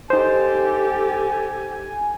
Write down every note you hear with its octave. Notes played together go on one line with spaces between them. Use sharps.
D#4 G4 A4 C5 G#5